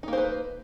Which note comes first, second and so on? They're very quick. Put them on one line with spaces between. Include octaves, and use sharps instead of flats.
D#4 A#3 C5 B4